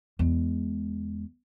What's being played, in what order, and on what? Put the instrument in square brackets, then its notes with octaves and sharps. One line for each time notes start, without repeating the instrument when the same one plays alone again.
[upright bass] E2 G#3